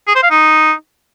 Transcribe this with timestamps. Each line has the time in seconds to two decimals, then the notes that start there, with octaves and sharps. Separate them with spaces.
0.08 G#4
0.15 C5
0.23 F5
0.31 D#4